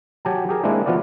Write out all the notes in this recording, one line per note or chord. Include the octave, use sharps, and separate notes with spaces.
F#3 G4 G#5 A5
G4 G#4 A#4
G#3 A#3 C4 D4 E4 G4
F3 B3 F4 F#4 D5